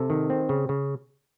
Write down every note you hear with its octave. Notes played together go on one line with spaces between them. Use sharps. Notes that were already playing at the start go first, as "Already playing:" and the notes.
Already playing: C3 A4
D#3
C4
C#3
C#3